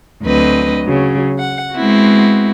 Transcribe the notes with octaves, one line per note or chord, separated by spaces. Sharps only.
D2 F#3 C4 B4 D#5
C#3 F#3
F#5
G#3 B3 C4 E4 F#4